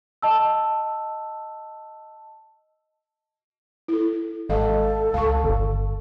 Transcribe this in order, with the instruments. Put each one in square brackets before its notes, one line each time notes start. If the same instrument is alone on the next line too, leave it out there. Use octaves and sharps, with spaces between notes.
[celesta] D#5 A5 E6
[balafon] E4 A4
[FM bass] G#1 [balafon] G#3 D#5 F5 [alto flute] A4
[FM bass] C#2 [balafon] F5 A5 C#6
[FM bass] G1